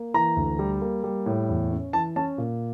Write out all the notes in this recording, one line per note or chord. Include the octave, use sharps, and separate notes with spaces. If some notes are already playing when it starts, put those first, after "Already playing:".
Already playing: A#3
E3 A#5
D2
G3
A#3
G3
A2
E2
C#4
E3 A5
C#4 A5
A#2